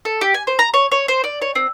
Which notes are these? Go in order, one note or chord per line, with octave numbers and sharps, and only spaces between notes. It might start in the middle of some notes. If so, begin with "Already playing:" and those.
A4
G4
G#5
C5
A#5
C#5
C#5
C5
D5
C#5
C4